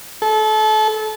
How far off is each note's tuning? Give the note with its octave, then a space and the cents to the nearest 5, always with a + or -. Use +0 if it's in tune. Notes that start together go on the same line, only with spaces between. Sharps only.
A4 -30